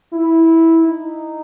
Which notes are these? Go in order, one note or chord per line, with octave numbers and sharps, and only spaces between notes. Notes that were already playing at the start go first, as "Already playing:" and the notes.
E4
D#4